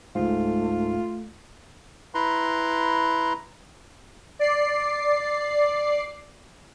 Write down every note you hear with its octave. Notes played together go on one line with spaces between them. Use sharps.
C#2 G#2 A3 F4
E4 B4 A#5 C6
D5 C7